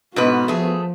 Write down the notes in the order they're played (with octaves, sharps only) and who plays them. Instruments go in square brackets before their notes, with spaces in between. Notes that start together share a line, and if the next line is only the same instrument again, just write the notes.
[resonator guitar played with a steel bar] G#2 B2 B4 [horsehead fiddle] B3 F#4
[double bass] F3 [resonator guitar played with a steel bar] A3 G#4